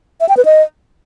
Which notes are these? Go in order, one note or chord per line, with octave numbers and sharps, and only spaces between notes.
E5
G5
B4
D#5